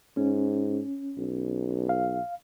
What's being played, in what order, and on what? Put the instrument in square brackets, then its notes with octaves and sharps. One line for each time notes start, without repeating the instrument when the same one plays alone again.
[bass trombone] G#2 [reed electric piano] C#4
[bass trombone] B1
[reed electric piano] F5